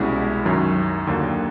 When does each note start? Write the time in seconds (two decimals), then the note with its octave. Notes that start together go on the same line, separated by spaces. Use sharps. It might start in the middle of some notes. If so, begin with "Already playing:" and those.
Already playing: C2 B2 G#3 C#4 E4
0.45 F#2 D#3 F#3
1.07 D#2 D3 F#3 A#3